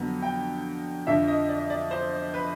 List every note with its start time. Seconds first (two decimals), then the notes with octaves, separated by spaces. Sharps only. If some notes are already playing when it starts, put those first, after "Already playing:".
Already playing: F2 D3 F#3 B3
0.22 G5
1.07 F2 D3 F3 E5
1.28 D#5
1.49 D5
1.70 D5
1.91 C5
2.34 B4